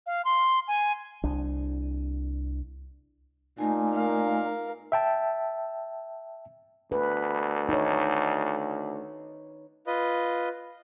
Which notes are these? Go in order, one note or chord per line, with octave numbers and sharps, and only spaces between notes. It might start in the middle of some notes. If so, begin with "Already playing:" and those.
F5
C6
G#5
C2 D4
A#2 A3 D#4 G#5
A#4 F5
E5 G5 A5
D2 B4
D#4 C#5
F4 B4 D#5